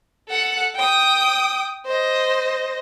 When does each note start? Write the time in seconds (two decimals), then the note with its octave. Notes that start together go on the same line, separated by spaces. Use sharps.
0.29 A4 F#5
0.76 G5 D#6
1.86 C5 D#5